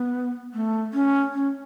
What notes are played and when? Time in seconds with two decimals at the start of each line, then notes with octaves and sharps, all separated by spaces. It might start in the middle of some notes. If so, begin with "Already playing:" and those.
Already playing: B3
0.54 A3
0.94 C#4
1.33 C#4